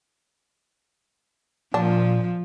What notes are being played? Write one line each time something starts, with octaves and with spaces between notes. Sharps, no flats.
A#2 F3 D4